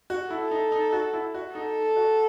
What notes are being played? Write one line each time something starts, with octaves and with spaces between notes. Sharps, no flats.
F#4
E4 A4
D#4
D#4
F#4
E4
F#4
D#4 A4
F#4